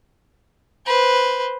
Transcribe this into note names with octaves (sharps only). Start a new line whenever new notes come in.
B4 C5